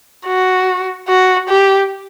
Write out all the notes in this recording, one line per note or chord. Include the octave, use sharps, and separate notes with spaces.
F#4
F#4
G4